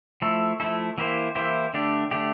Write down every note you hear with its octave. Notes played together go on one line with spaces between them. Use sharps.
F3 A3 E4 A4
F3 A3 E4 A4
E3 A#3 E4 G4 C5
E3 A#3 E4 G4 C5
D3 A3 D4 G4
D3 A3 D4 G4